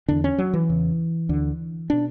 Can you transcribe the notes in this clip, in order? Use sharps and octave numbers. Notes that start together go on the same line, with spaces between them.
E2 D3 D4
C#4
F#3
E3
E2 C#3
D2 D3
B2 D4